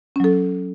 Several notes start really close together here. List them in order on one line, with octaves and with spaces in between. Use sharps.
C#4 F#3 A4